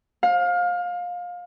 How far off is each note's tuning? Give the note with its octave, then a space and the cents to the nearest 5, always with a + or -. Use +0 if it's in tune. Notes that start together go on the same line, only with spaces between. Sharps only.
F5 +25